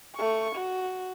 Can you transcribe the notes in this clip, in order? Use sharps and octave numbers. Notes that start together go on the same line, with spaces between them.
A3 C#6
F#4